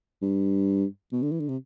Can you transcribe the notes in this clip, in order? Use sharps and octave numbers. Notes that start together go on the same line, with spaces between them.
G2
B2
D3
E3
D3
C3